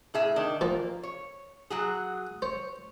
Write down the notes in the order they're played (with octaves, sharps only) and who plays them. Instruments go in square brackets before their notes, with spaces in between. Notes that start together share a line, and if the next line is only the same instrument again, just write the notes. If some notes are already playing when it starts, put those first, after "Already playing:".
[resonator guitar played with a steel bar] A2 G#4 E5
D#3 D4
[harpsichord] A#2 F3 [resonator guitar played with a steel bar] A#3
[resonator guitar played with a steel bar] C#5
F#3 F#4 G#4
[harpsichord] C5 [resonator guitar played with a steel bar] C#5